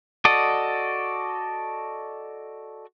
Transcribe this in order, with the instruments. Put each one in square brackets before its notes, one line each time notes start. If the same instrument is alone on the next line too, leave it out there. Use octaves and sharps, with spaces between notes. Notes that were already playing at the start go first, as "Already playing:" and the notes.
[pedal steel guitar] F#4 A4 D5 D#5